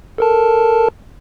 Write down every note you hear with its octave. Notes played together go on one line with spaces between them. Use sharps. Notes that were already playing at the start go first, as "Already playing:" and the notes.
A4 A#4 A5